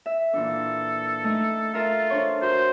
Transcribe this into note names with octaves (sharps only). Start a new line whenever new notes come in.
E5
A#2 E3 D4 A4
A3 D#4 D#5
F4 A4 A#4 E5
D4 C5 C#5
F#4 A#4 C5